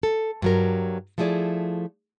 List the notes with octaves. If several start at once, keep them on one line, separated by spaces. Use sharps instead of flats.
A4
G2 F#3 A#4
F3 A3 E4 G#4 D5